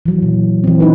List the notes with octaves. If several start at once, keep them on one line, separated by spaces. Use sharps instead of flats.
E3 F#3
A#2
E3 C4
C#4 D#4 B4